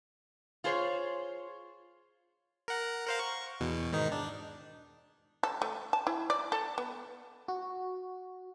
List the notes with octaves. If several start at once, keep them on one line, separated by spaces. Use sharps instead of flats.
F4 G#4 C5 C#5
A#4 F#5
A#4 C5 F5
C#6
E2 B2
G#2 D#3 D#4
D4
A4
A3
A5
E4
D5
A4
B3
F#4